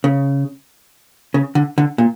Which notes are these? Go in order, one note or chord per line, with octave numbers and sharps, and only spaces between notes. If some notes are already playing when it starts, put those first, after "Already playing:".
C#3
C#3
D3
D3
A#2